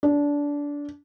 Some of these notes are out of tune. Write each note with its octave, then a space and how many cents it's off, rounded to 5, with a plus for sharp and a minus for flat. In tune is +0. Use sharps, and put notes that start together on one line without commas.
D4 -20